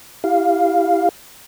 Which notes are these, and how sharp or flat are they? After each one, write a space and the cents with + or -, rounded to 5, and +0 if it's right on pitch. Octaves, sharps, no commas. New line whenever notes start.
E4 +0 G4 +0 F5 +0